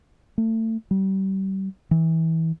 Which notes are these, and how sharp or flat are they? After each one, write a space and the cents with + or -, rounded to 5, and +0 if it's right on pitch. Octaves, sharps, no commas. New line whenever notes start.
A3 +30
G3 -30
E3 -25